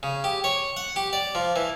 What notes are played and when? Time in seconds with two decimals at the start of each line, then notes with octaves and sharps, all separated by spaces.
0.03 C#3
0.24 G4
0.44 C#5
0.77 F#5
0.96 G4
1.13 D5
1.35 F3
1.56 E3